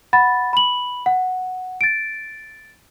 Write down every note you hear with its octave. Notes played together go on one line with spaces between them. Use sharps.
F#5 B5 A6
B5 F#7
F#5
A6 D7